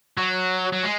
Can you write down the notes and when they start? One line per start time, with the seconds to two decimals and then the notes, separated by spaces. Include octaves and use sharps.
0.17 F#3
0.72 F#3
0.83 G#3